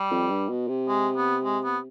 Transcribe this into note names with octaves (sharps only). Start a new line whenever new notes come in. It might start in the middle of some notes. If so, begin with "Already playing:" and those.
Already playing: G3
F2
G2
B2
C3
G#3
B3
G#3
B3